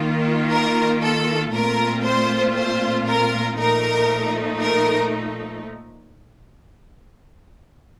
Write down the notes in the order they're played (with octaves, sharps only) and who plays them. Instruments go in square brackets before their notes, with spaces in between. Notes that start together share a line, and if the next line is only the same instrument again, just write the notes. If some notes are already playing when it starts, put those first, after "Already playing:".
Already playing: [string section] D#3 A#3 F4
A#4
A4
A#2 A3 C4 F4 A#4
C5
C5
A#4
A#2 F3 A3 D#4 A#4
A#4